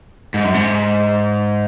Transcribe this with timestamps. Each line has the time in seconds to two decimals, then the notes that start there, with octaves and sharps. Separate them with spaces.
0.34 G#2
0.44 F#2
0.54 G#2